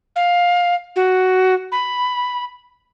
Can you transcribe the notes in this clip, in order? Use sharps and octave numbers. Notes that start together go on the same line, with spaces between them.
F5
F#4
B5